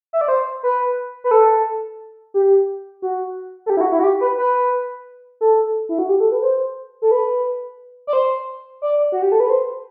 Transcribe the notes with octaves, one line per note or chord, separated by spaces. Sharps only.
E5
D5
C5
B4
B4
A4
G4
F#4
A4
G4
E4
F#4
E4
F#4
G4
B4
B4
A4
E4
F#4
G4
A4
B4
C5
A4
B4
D5
C5
D5
F#4
G4
A4
B4
C5